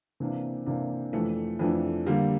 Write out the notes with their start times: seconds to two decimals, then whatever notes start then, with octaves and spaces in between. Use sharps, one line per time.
0.20 C3 E3 A#3 D4
0.66 C3 E3 A#3 D4
1.13 F2 E3 A3 D4
1.59 F2 E3 A3 D4
2.06 D3 G3 A#3